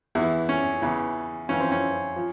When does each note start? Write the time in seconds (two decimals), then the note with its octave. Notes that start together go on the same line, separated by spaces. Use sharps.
0.15 E2 E3 E4
0.49 C#4
0.82 E2 C#3 E3
1.49 F2 E3 C#4
1.60 C4
1.72 C#4
2.16 F3